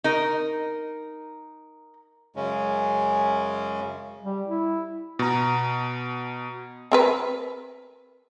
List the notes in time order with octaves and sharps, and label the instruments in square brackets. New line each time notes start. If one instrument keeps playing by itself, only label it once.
[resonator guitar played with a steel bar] D#4 A#4
[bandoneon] F#2 C#3 G#3 C#4
[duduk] G3
E4
[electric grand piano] B2 A#5
[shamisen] C4 A#4 B4